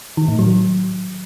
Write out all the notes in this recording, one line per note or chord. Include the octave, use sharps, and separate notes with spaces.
D#3
A2
F#3